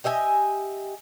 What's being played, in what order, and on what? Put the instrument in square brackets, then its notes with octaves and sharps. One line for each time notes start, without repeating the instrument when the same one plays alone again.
[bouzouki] G4 D#5 E5 G#5